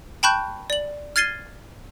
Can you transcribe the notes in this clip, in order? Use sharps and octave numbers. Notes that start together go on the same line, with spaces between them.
G5 A5 B5 C#6 F#6 G6
D5 F#7
F6 G#6 A6 C7 D#7 G7